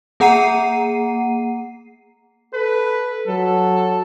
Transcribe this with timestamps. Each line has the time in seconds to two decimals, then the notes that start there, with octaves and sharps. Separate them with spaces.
0.20 A#3 G#4 F#5 A#5 C7 D#7
2.54 A4 B4
3.28 F#3 A4